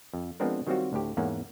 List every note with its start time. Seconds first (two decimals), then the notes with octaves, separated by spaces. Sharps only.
0.14 F2
0.40 F3 G#3 B3 C4 D4 A#4
0.67 D#3 F#3 G3 C4 F4 F#4
0.93 D2 A2 G4
1.17 E2 G#2 A#3 C#4 F#5